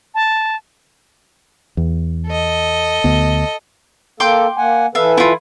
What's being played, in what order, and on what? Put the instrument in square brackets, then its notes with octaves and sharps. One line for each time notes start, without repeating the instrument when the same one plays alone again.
[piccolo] A5
[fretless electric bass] E2
[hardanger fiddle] A4 D#5
[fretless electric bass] D2 B3
[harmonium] A#3 A4 [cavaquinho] G5 C6 D6
[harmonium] A#3 F#5 G#5
[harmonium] E3 A4 B4 [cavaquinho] E5 F5
[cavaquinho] E4 F4